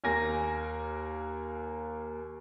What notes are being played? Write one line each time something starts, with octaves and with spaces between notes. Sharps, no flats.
D#2 A#3 A#4 G#5 A#6